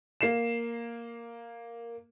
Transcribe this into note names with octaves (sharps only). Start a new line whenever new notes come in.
A#3 C7 E7